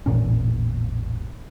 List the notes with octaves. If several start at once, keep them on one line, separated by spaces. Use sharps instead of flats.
E1 A1 A#2 C#4